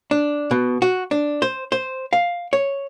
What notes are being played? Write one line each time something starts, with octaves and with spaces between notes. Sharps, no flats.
D4
B2
F#4
D4
C5
C5
F5
C#5